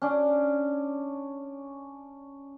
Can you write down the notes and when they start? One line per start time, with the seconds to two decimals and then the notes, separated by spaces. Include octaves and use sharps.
0.02 C#4 D4